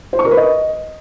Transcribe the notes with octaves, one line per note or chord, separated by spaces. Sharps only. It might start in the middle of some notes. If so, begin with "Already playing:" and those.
C5
C#6
A#4
B4
D#5